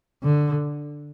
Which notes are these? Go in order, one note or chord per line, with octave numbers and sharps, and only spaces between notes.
D3